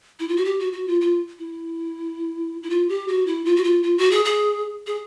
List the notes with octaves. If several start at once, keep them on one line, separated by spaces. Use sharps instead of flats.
E4
F4
F#4
G4
F#4
F#4
F4
F4
E4
E4
F4
G4
F#4
E4
F4
F#4
F4
F4
F#4
G#4
G#4
G#4